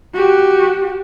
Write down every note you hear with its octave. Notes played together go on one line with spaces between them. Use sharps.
F#4 G4